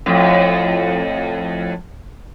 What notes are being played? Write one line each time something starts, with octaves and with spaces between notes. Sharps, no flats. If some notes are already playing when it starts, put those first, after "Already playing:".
F2 A2